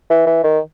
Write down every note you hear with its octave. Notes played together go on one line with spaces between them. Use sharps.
E3
E3
D#3